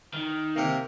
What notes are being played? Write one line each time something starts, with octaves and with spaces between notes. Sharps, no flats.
D#3
C3 A#3